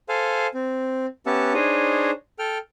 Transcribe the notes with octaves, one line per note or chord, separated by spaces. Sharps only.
A4 C5 F5 G#5
C4
B3 C#4 G4 E5 F#5 A5
D4 D#4 G#4 C5 C#5 D#5
A4 G5 F6